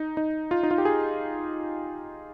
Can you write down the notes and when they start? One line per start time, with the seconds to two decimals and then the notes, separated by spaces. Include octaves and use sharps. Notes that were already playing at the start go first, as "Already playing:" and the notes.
Already playing: D#4
0.17 D#4
0.51 F4
0.63 D#4
0.71 F4
0.78 G4
0.85 G#4